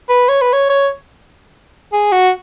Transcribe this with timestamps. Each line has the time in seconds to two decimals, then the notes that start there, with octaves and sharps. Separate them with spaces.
0.09 B4
0.28 C#5
0.41 B4
0.53 C#5
0.69 C#5
1.93 G#4
2.12 F#4